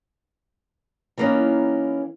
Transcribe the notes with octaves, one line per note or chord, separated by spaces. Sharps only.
E3 G3 A#3 B3 C#4 D#4